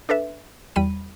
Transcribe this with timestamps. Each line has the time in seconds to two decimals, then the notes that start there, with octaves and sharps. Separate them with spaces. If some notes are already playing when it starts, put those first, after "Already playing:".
0.09 D4 A4 B4 E5
0.76 E2 G3 B5 D#7